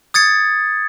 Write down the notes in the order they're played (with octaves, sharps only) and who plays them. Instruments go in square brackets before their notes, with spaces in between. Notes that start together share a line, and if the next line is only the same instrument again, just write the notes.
[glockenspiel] D#6 G#6 A6 C#7